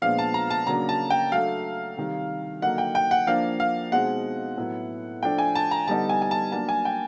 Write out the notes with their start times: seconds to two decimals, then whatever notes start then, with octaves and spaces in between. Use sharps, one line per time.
0.02 A#2 F3 G#3 B3 D4 F5
0.19 A5
0.34 A#5
0.51 A5
0.67 C#3 F#3 A#3 D4 A#5
0.89 A5
1.10 G5
1.32 F#3 A3 D4 F5
1.97 C3 D#3 G3
2.62 D3 F#3 A#3 D#4 F#5
2.78 G5
2.95 G5
3.11 F#5
3.27 F3 A#3 D4 F5
3.60 F5
3.92 B2 G#3 C4 D#4 F#5
4.57 A2 F#3 B3 E4
5.23 F3 A3 D4 G5
5.38 G#5
5.55 A5
5.71 A#5
5.87 D3 G3 B3 D#4 A5
6.09 G#5
6.22 G#5
6.31 A5
6.52 F#3 A#3 D4 A5
6.69 G#5
6.85 G5